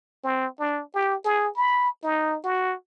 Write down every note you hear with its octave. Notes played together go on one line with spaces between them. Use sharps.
C4
D4
G4
G#4
B5
D#4
F#4